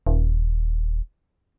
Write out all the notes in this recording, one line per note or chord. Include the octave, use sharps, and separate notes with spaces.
D#1